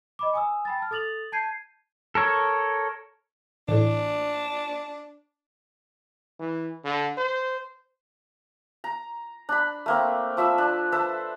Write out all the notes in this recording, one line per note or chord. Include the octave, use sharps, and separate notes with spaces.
D#5 B5 D6
G#5 D#6 E6
G5 B5 A6
A5 F6
A4 D#6 A6 F7 F#7
A5 G6 G#6 C7 D#7
A4 A#4 C#5
A1 A2 D4
E3
D3
C5
A#5
D4 B5
A3 A#3 C4
F3 E5 B5 E6
D4
A4 B4 C5 E5